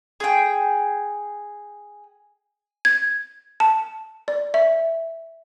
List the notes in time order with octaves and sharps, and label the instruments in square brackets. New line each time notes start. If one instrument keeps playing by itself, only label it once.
[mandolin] G#4 G5
[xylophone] G#6
A5
D5
E5